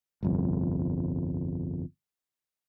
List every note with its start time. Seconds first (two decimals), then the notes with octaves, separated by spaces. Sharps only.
0.23 G1 C2 F2